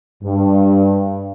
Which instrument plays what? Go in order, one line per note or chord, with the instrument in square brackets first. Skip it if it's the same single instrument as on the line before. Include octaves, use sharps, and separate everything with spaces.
[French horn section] G2